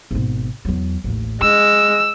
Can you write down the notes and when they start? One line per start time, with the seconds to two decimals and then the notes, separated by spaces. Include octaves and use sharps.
0.11 G#1 B2
0.65 E2 F#3
1.04 A1 D#2
1.41 G#3 D4 E6